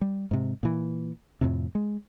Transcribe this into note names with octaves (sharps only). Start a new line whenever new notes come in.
G3
G#2 C3
A#2 E3
F2 A2 C3
G#3